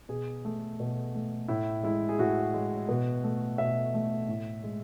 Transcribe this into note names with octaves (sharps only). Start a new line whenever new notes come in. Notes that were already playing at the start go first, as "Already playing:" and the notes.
B2 G#4
A3
B2
A3
A2 E4
G#3 E4
G#4
A2 F#4
G#3
B2
A3
B2 E5
A3
A2
G#3